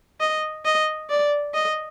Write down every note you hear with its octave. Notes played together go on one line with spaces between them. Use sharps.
D#5
D#5
D5
D#5